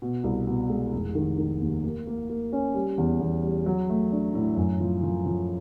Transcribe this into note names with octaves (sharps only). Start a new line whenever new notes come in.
B2
C2
B2
G#3
F1
D#3
D#3
D#2
A#3
A#3
A#3
C#4
G3
E2
E2
G3
F#3
A3
D4
A2
F#2
F3
F3
F3